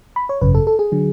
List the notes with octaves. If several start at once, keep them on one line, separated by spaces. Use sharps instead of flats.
B5
C#5
G#1 F#2 C#3 B4
A4
A4
G#4
D3 F#3